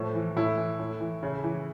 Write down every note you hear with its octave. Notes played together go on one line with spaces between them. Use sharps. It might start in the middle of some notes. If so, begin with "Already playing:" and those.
Already playing: A2 F3
E3
A2 E4
E3
A2
E3
C#3
E3